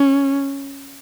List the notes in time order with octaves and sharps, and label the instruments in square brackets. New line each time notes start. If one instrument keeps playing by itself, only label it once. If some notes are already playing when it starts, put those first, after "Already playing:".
Already playing: [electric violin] C#4